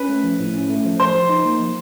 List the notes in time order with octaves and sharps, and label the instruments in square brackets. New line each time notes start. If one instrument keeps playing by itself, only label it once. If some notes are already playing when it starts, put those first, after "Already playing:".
Already playing: [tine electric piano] C#4 [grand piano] B4
[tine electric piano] A3
F3
A2
C#4
A3
F3
[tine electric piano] F3 [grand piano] C5 C6
[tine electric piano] F3
D#4
A#3
F3